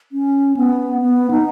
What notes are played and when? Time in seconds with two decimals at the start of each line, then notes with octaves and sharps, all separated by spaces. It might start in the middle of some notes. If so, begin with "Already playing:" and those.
0.12 C#4
0.57 B3
1.01 B3
1.31 D#4